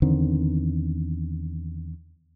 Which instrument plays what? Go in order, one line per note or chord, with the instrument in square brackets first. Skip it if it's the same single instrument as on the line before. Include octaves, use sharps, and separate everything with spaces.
[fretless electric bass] E2 D3 D#3 C4